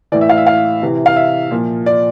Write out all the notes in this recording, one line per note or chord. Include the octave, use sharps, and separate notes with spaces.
A2 E3 D5
E5
F5
E5
F5
C3 E3
F5
E5
A#2 F3
D5